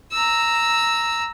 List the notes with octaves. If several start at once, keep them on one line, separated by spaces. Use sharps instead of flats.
A#5 E6